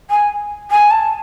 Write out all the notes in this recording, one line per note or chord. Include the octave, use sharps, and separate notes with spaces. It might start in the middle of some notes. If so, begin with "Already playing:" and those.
G#5
G#5
A5